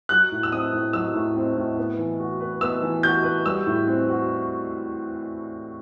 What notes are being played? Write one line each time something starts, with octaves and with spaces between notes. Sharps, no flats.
F#3 F#6
A2
E6
C4 D#6
A2
F#3 E6
A2
C4
A2
B3
E3
F#4
B4
B3 E6
E3
F#4 G6
B4
G3 E6
A2
C4
F#4